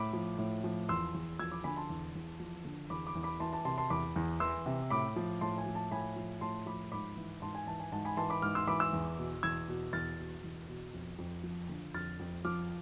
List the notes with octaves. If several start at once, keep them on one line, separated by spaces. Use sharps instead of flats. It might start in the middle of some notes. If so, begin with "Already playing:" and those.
Already playing: A2 B5 D6
F3
A2
F3
E2 C6 E6
E2
F3 E6 G#6
B5 D6
D3 G#5 B5
A5 C6
E2
E2
F3
D3
E2 B5 D6
B5 D6
E2
B5 D6
E3 A5 C6
A5
C3 A5 C6
A5 C6
E2 B5 D6
E2
E3 C6 E6
C3
A2 B5 D6
F3
A2 A5 C6
G#5
F3
A5
A2 G#5 B5
F3
A2 A5 C6
F3 B5 D6
G#2 B5 D6
E3
G#2 A5 C6
G#5
E3 A5
G#5
G#2 A5
G#5 B5
E3 A5 C6
B5 D6
G#2 D6 F6
C6 E6
E3 B5 D6
C6 E6
E2
B2
E2 E6 G#6
B2
E2 F6 A6
B2
E2
B2
F2
F2
F3
D3
F2 F6 A6
F2
F3 D6 F6